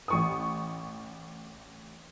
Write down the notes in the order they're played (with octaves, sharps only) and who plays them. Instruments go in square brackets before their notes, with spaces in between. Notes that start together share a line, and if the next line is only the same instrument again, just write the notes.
[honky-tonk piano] A1 C#6 D#6